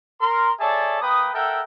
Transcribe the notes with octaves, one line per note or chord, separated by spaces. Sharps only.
A#4 C6
G#4 A4 C#5 D5 E5 A5
A#3 B4 G5 D#6
A4 A#4 E5 F#5 G5